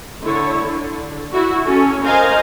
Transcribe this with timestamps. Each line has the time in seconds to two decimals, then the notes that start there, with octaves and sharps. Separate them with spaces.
0.21 D3 E4 C#5
0.65 D3
1.33 E4 F#4
1.66 C#4 A4
2.02 A#4 C5 D#5 F5 G#5 A#5